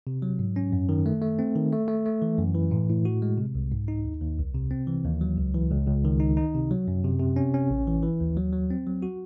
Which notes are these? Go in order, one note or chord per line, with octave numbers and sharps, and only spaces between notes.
C3
F#3
G#2
C#4
F#2
D#3
A3
A3
C4
D#3
A3
A3
A3
E3
F#2
E3
A2
A2
F#4
G#3
C3
C2
G#2
D#4
D#2
D#2
C2
C3
C4
E3
D#2
F#3
C#2
E3
C#2
C#2
D#3
D#4
D#4
C3
F#3
F#2
C3
C3
C#4
C#4
A1
E3
E3
D#2
F#3
F#3
C4
F#3
F#4